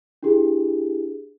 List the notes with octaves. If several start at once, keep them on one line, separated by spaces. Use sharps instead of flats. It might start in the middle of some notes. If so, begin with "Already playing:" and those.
D4 E4 G4 G#4